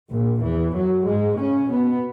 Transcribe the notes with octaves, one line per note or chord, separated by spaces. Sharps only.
A#1 A#2
E2 E3
F#2 F#3
G#2 G#3
C#3 C#4
B2 B3